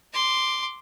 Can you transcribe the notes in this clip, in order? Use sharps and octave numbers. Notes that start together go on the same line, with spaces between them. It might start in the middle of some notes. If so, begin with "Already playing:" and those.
C6 D6